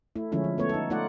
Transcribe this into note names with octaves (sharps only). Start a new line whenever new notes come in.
A3 E4
D3 F3 G#3 C#4 E4
F3
A3 B3 C#5
D#4 A4
A3 D#4 F4 D5 F#5